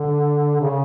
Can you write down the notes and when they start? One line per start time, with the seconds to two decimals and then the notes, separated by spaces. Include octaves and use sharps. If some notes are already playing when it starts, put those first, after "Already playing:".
Already playing: D3
0.60 C#3